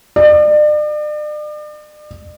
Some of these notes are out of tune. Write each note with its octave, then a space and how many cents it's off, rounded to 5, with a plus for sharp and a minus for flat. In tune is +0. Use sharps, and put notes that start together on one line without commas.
D5 +40